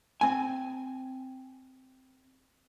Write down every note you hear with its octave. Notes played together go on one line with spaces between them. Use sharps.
C4 G#5